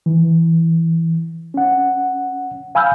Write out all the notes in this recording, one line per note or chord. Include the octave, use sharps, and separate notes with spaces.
E3
C#4 F#5
F5 G#5 B5 E6 F6 G6